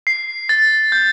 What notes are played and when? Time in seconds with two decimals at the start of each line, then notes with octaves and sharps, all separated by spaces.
0.07 C7
0.49 A6
0.92 G6